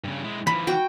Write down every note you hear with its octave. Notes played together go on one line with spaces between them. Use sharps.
G2 C#3
G#3 E4
E3 F3 B5
F#4 G5